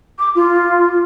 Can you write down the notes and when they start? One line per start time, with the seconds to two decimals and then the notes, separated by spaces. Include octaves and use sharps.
0.19 D6
0.35 F4